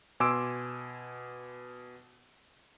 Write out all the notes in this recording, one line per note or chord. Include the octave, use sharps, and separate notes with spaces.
B2 G#5 C6 D6 E6 D7